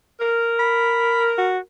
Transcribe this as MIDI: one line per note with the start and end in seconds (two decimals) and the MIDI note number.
0.20 1.63 70
0.59 1.30 83
1.38 1.58 66